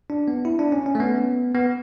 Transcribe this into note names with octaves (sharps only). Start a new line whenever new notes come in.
D4
B3
E4
D4
C#4
C#4
A3
B3
B3